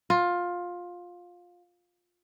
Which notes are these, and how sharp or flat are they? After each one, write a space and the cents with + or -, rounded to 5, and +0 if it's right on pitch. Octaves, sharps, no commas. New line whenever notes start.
F4 +15